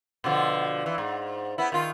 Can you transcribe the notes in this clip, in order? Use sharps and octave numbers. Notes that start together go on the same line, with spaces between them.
B2 D3 F3
E3
G#2
B3 E4
D#3 F4